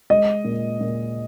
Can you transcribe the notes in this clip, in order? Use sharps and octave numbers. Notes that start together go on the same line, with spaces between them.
G#3 D#5
A#2
A#2